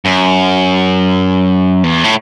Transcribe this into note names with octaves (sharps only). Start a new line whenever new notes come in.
F#2
E2
A2